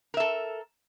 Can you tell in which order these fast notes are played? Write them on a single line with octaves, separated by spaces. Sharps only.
A#4 E5 A4